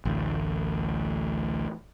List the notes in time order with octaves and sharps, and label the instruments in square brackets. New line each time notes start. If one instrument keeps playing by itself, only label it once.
[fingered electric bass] A1 D2